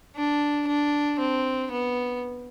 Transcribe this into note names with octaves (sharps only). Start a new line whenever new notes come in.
D4
D4
C4
B3